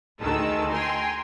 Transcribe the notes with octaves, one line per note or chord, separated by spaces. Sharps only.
D2 D#3 G#3 A5 E6
G5 G#5 A#5 C6